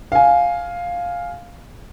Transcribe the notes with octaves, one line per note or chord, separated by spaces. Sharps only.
F5 G#5